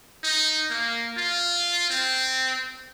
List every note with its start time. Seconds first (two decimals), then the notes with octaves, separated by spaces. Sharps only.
0.24 D#4
0.70 A#3
1.17 F4
1.90 C4